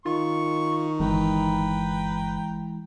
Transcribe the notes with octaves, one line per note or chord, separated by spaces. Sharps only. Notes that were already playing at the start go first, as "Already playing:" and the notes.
D#3 F4 C#6
G1 E3 G#3 B4 G5 A#5